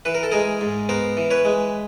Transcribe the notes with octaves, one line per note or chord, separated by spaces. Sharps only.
E3 B4
A#4
A4
G#3 G#4 A#4
G#2
B3 A#4 C5
E3
B4 C#5
G#3